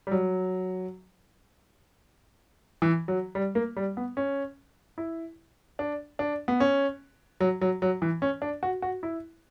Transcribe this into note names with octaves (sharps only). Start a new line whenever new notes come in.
G3
F#3
E3
F#3
G3
A#3
G3
B3
C#4
E4
D4
D4
B3
C#4
F#3
F#3
F#3
E3
C#4
D4
F#4
F#4
E4